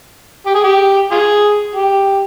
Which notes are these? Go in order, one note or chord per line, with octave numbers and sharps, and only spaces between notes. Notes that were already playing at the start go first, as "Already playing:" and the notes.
G4
G#4
G4
F4 G#4
G4